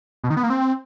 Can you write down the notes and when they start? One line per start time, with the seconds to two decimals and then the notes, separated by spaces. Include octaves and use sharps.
0.24 B2
0.30 D#3
0.37 B3
0.43 A#3
0.50 C4